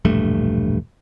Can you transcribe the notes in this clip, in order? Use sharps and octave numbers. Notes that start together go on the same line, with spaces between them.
E1 A#1 G2 A3